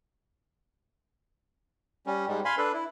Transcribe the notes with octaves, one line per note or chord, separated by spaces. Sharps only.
G3 C#4
G#2 G3 G#3
F5 G#5 B5 C6
D4 A4 B4
E4